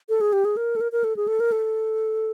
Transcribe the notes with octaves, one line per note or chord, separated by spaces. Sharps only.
A4
G#4
G4
G#4
A#4
A4
A#4
A#4
A4
G#4
A4
A#4
A4